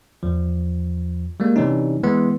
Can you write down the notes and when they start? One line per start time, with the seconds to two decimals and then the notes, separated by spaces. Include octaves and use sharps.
0.23 E2 F3
1.40 G3 G#3 A#3
1.56 C3 E3 G3 C#4 D#4
2.03 E3 G#3 B3 C6